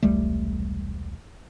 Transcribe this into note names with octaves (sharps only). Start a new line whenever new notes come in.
E1 C2 G3 A3